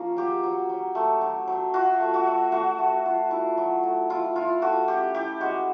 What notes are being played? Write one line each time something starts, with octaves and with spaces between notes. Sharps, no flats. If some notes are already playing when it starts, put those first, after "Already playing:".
Already playing: F3 A#3 C#4
F#3 G4
F#3
F#3
A3
F#3
F#3
F4 F#4
A3
F#4
A3
A3 F#4
A3
F4
E4
F#3
A3
E4 F4
E4 F4
A3 F#4
C#4 G4
E4 G4
G#3 F#4